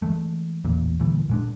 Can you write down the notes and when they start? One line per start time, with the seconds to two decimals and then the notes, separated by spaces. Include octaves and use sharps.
0.02 E3 G#3 A3
0.64 A1 E2 A#2
1.00 D2 A#2 E3 G3
1.29 A#2 G#3 D4